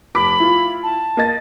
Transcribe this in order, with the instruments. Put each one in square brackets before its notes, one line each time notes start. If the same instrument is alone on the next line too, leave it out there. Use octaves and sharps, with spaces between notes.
[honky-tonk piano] F1 D6 B6 [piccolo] B5
[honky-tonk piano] E4 F4
[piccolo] A5
[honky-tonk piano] A#3 D#5 A6